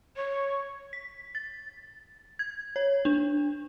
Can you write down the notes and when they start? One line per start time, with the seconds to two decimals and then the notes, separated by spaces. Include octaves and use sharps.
0.16 C#5
0.93 B6
1.35 A6
2.39 G#6
2.76 C#5
3.05 D4